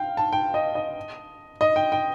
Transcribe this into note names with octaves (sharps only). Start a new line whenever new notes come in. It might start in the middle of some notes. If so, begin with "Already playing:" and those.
Already playing: F5 G5
A5
G5
D#5
D#5
D#5
G5
G5